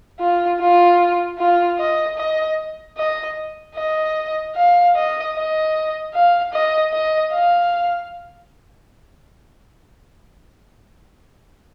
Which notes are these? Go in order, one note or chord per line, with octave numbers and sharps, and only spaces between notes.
F4
F4
F4
D#5
D#5
D#5
D#5
F5
D#5
D#5
F5
D#5
D#5
F5